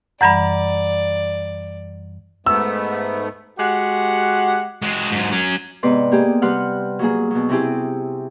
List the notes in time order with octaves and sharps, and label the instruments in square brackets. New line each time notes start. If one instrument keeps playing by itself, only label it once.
[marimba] F#2 E3 G3 [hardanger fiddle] D5 [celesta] F#5 A#5 B5
[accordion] G#2 A3 B3 [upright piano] E6
[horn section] G#3 F#4 G4 F#5
[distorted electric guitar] G#3 F#4
G#2 F#3
F#3 C#4
[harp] G#2 C3 B3 B4 D5 C6
A#3 G4 G#4
C3 G3 B4 F#5 C6 F6
F#3 A#3 G#4
B2 F#3
C3 C4 E4 G4 G#4